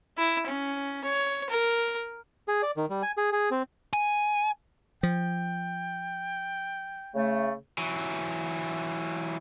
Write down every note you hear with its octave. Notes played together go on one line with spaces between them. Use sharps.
E4
C#4
C#5
A#4
G#4
D5
D#3
G3
G#5
G#4
G#4
C4
G#5
F3 G5
C#3 A3
E3 F#3